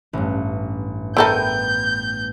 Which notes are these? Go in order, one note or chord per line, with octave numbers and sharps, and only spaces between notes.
A1 G2
B3 E4 A4 A#4 G5 G6 D#7